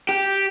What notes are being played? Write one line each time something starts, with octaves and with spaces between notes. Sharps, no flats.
G4